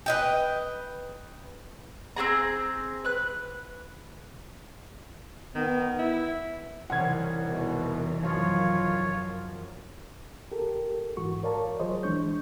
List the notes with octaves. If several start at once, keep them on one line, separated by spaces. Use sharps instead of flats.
B4 D#5 G5
C4 F#4 G#4 A#5
B4 F#6
D#3 B3
E4
C2 D#3 E3 C#4 F#5 G#6
E2 B2
F#2 F3 F4 C#5
G4 A4 A#4
G#2 E3 F#4 C#6
A#4 C#5 D5 F5 A5 A#5
F3 F#3 G#4 C5 C#5 D#5
D2 E3 G#3 D4 C#6 G6